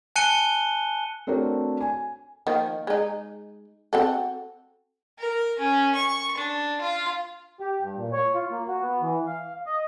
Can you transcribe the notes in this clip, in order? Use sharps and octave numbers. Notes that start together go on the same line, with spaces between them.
G#5 A5 F#6 C#7 D#7 G7
A3 C4 D4 F#4 A#4 C#5
G#5
D#3 F3 A#3
G#3 D#4
C4 F#4 A4
A#4
C#4
C#6
D4
F4
G4
G2
A#2
C#5
F4
A#3
F#4
B3
E3
F5
D#5